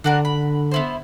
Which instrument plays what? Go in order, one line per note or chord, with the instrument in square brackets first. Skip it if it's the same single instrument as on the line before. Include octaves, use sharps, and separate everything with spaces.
[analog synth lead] D3 [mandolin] D4 F#4 A#4
[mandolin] B5
B3 E4 C5